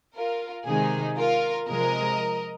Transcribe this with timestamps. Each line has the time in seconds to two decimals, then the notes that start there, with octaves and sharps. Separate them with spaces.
0.15 F4 A#4
0.66 C3 D#3 G#3 D#4 G#4
1.17 F4 A#4
1.68 C3 F3 G#3 A#4 D#5